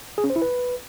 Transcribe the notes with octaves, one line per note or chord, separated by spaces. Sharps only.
G#4
C#4
C5
E4
B4